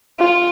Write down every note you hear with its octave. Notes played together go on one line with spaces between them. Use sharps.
F4